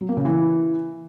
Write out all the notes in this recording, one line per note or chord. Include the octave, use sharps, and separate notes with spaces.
F#3
A#3
C#3
E3